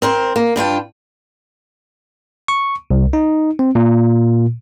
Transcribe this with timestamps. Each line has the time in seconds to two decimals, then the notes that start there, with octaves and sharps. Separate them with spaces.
0.02 C4 A#4 C5
0.36 A#3
0.56 G2 D4 F4 G5
2.48 C#6
2.91 C2
3.13 D#4
3.59 C4
3.75 A#2